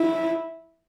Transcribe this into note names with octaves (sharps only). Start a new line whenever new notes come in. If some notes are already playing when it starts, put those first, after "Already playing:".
Already playing: E4